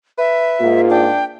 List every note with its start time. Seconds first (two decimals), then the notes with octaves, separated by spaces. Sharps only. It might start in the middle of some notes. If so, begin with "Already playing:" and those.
0.18 B4 E5
0.60 G#2 A#3 F4
0.90 D4 G5